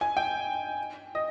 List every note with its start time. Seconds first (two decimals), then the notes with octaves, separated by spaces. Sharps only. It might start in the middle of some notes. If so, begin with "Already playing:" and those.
0.01 G#5
0.17 G5
1.15 D#5